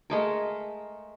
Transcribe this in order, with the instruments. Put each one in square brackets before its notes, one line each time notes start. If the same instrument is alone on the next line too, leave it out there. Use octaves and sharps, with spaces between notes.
[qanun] G#3 A3 A#4